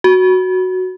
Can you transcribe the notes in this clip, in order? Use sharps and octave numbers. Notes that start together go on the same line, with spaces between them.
F#4